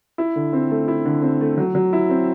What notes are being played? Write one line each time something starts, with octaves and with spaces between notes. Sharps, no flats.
E4
D3
C4
A3
E4
D3
C4
A3
F#3
F#3
E4
C4